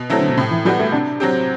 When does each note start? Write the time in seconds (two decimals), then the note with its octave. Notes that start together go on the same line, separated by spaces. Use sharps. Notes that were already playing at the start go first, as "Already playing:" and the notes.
Already playing: B2
0.10 F#3 A3 C4 E4
0.19 D3
0.29 B2
0.37 A2 C3
0.51 E3
0.65 E3 F#3 G3 B3 F#4
0.79 A3
0.92 C3 D4
1.20 F#3 C4 G4